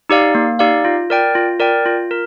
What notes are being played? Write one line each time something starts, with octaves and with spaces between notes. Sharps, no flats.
D#4 G4 D5 F5
A#3
D#4 G4 D5 F5
F4
A#4 D5 G5
F4
A#4 D5 G5
F4
A#4